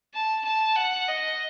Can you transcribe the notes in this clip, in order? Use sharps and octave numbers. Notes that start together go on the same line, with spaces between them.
A5
A5
F#5
D#5